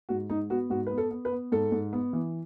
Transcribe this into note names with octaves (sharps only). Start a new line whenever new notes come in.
G#2 F#4
G#2 D#4
B3 F#4
G#2 F#4
B3 B4
A4
B3
B4
B3
G#2 A4
G#2
B3
E3